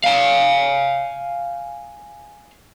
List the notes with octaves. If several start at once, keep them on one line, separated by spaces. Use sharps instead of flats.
F5 G#5